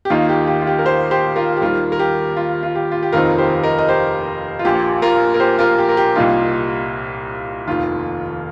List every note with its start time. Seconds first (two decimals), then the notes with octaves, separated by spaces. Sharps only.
0.05 G4
0.10 D#2 D#3 A#3 D#4 F4
0.29 G4
0.47 G4
0.62 F4
0.67 G4
0.79 A#4
0.85 G4 C5
1.11 G4 C5
1.36 F4 A#4
1.57 G4
1.61 D#2 D#3 G3 F4 A#4
1.92 A#4
1.99 G4
2.37 F4
2.63 F4
2.75 G4
2.92 F4
3.03 G4
3.13 F1 D#2 D#3 C4 D#4 F4 A#4
3.38 G4 C5
3.63 A#4 D#5
3.79 D#5
3.88 G4 C5
4.59 F4
4.65 A#1 A#2 A#3 G4
5.02 F4 A#4
5.34 A#4
5.40 G4 C5
5.59 F4 A#4
5.78 G4
5.89 A#4
5.97 G4
6.16 C2 A#2 G3 A#3 D#4 F4
7.68 F1 D#2 D#3 F4